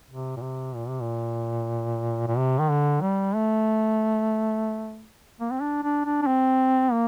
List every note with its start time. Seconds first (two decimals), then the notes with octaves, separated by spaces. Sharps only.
0.10 C3
0.37 A#2
0.42 C3
0.75 A#2
0.88 C3
1.01 A#2
2.28 A#2
2.37 C3
2.59 D#3
2.70 D3
3.01 G3
3.35 A3
5.40 A#3
5.51 C4
5.61 D4
5.83 D4
6.06 D4
6.22 D4
6.27 C4
6.92 A#3